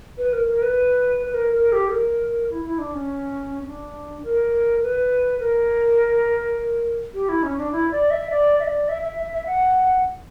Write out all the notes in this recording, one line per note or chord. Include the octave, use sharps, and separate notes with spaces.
B4
A#4
A#4
B4
B4
A#4
A#4
G4
A#4
E4
E4
D4
C#4
D4
A#4
B4
A#4
G4
E4
C#4
D4
E4
D5
E5
D5
E5
D5
E5
E5
E5
E5
F#5